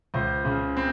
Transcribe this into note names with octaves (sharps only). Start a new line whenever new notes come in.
C#2 C5
C#3
C4